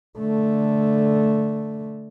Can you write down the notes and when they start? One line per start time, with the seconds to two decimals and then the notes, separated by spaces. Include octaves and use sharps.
0.19 D3 A3